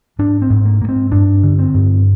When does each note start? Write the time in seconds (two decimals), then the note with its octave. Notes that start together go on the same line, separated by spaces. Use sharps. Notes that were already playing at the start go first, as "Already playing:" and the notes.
0.19 G#2 D4
0.42 C4
0.50 G#2
0.65 A#3
0.81 G#2 A#3
0.89 C4
1.12 G2 D4
1.43 D3
1.59 C4
1.74 G2